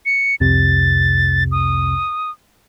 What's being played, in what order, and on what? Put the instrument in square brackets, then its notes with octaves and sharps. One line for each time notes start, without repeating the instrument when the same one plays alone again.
[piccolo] C#7
[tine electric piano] C2 F2 C3 [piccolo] A6
[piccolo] D#6